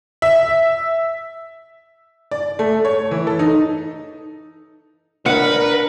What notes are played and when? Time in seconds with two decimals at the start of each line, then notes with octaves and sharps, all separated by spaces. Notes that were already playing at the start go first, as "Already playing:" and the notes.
0.22 E5
2.31 D5
2.59 A3
2.85 C#5
3.11 E3
3.27 A4
3.39 D#4
5.26 D4 A#4 B4 F#5